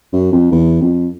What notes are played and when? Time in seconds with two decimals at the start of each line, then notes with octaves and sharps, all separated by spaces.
0.13 F#2
0.32 F2
0.52 E2
0.82 F2